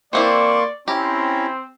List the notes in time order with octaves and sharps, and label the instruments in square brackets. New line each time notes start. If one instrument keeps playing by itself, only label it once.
[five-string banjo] E3 C4 E4 [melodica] A#3 C6 C#6 [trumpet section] D5
[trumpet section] C4 [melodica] C#4 E4 A#5 [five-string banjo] G4